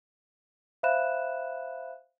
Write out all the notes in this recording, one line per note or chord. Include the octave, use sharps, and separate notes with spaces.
C5 E5 F5 B5 F#6 E7